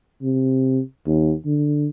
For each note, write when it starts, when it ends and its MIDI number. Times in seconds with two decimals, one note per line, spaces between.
0.22 0.80 48
1.07 1.34 39
1.46 1.88 50